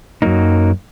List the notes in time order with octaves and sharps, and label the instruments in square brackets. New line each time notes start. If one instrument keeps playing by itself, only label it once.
[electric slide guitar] F#2 F#3 A#3 D#4